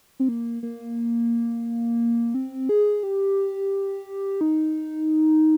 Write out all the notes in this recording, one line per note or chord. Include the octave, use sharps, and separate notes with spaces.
C4
A#3
A#3
C4
G#4
G4
D#4